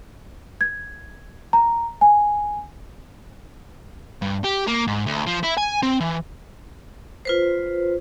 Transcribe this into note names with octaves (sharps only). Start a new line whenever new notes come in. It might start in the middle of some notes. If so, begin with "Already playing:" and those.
G#6
A#5
G#5
G2
G4
A#3
G#2
D2
F3
E4
G#5
C4
E3
F4 B4 C5